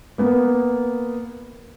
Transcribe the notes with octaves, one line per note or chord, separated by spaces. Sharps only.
A#3 B3